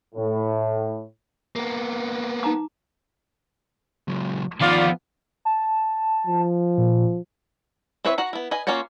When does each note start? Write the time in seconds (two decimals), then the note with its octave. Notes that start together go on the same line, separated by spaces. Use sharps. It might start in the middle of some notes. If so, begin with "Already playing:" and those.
0.15 A2
1.56 A#3 B3
2.43 D#4 A#5 D6
4.08 C#2 F#3
4.61 D#3 F3 B3 F4 D5 F5
5.45 A5
6.27 F3
6.77 A#2
8.05 C4 E4 B4 C#5 E5
8.18 F#4 F#5 A#5
8.33 B3 E4
8.51 B4 D#5 G#5
8.67 A#3 C#4 F4 F#4 C#5